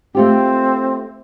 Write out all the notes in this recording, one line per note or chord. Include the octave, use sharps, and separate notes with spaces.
A3 C4 F4 G4